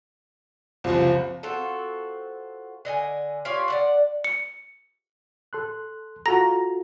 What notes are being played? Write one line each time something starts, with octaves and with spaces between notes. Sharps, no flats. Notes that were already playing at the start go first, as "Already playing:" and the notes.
F#1 C2 F3
C4 F4 F#4 A4
D3 D#5 F#5 G#5
F4 G4 C#5 D5
D5 E5 F#5
C#7
A4 C6 F#6
F4 F#4 A4 A#5 A#6